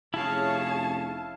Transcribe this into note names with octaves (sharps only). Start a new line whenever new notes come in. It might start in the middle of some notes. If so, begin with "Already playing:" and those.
F1 C#4 E4 G#4 C#5 F5 A5